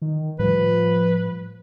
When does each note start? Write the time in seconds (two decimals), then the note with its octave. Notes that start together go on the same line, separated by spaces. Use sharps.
0.02 D#3
0.39 A2 F3 G3 B4